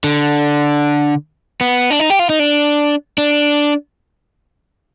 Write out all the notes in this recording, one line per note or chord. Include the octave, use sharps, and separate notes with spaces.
D3
B3
D4
D#4
G4
F4
D#4
D4
D4